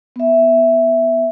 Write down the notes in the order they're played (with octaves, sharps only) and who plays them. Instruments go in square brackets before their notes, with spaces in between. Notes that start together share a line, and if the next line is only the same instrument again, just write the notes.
[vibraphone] B3 E5